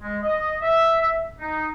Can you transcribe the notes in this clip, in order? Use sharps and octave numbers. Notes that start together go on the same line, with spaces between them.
G#3
D#5
E5
D#4